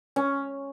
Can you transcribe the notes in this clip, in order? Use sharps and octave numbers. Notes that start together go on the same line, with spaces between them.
C#4